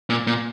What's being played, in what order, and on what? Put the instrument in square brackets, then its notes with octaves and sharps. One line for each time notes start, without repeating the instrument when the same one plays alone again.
[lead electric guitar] A#2
A#2